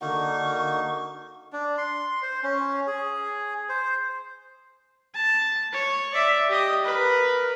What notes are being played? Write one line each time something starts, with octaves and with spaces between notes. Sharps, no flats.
D3 A#3 D#4 F#4 C#6
D4
C6
C5
C#4
G#4
C5
A5
C#5
D5 E5
G4 D#5
A#4 B4